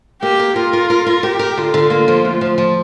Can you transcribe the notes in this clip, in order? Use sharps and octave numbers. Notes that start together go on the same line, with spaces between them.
A#3 G4
A#4
F4 A#4
A#4
A#4
A#4
G4 A#4
A#4
D3 F4
D3
A#3
F3
D2
F3
F3